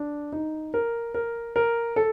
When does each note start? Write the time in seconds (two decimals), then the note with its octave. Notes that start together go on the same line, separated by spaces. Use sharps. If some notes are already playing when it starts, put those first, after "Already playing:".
Already playing: D4
0.32 D#4
0.74 A#4
1.14 A#4
1.56 A#4
1.96 A4